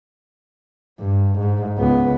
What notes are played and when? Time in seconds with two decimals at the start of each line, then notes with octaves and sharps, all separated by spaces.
1.00 G2
1.39 G#2
1.78 C#2 B3